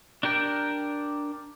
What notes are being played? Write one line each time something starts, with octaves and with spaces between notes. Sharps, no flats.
D4 G4 A#4 G5